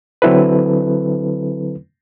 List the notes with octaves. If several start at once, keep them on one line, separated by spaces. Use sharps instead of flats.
D3 F#3 C4 E4 A4 B4